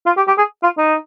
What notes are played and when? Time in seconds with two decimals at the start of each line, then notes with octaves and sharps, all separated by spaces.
0.06 F4
0.17 G4
0.27 G4
0.38 G#4
0.63 F4
0.78 D#4